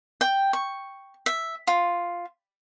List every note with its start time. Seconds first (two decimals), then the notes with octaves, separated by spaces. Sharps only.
0.21 G5
0.53 C#6
1.26 E5
1.67 F4